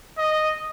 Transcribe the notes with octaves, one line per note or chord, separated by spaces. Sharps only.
D#5